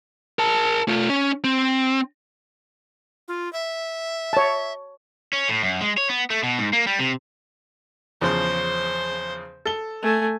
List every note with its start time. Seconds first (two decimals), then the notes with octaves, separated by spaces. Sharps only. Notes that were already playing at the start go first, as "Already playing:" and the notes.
0.39 A#4 A5
0.88 A3 F4
1.09 C#4
1.44 C4
3.28 F4
3.53 E5
4.33 C#5 A5
5.33 C#4
5.49 A2
5.62 F#2
5.81 G#3
5.98 C#5
6.09 B3
6.30 A3
6.43 B2
6.59 G#2
6.73 A#3
6.87 G3
7.00 C3
8.22 E2 C#3 F3 C5
9.66 A4 G7
10.02 A3 G#5